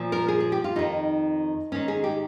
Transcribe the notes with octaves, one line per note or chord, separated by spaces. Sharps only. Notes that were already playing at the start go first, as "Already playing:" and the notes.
Already playing: A#2 F3
A#4
G#4
G#4
G4
F4
F2 D#3 D#4
G#2 D#3 C#4
G#4
G4